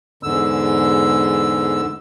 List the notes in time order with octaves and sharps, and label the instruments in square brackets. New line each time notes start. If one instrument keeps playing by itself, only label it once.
[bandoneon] E2 G#2 D3 E6